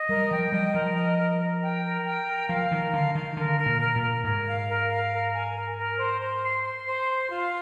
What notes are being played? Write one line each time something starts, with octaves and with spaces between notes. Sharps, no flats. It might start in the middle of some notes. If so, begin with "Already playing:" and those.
Already playing: D#5
G3 A#4
F3 G5
G3 D#5
F3 A#4
D#5
A#4
A#4
G5
A#4
G5
A#4
F3 F5
D#3 A#4
D3 F5
D#3 F5
D3 A#4
A#4
A#2
A#4
A#2
A#4
G#2 A#4
F5
A#4
F5
A#4
G#5
A#4
A#4
C5
C5
C6
C6
C5
C6
F4